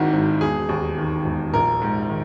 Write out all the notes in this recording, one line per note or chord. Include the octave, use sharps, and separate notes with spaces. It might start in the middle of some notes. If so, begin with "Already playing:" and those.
Already playing: G#1 G#2 D#3 D#4 E4 F#4
G#1
E1 G#4
D#2
D#3
E1
A#1 A#4
G#2
D#3